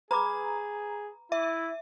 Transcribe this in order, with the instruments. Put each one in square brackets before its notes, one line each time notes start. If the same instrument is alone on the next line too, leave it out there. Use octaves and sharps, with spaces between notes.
[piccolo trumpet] G#4 [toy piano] B4 B5 D6 [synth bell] A#5
[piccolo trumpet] E4 [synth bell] E5